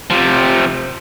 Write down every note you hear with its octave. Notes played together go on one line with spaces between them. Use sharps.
C3 F3